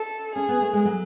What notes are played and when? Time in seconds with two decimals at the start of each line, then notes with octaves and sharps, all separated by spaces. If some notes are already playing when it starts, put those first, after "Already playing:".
Already playing: A4
0.36 C#4 G#4
0.49 B3
0.61 A3
0.73 G#3
0.85 F#3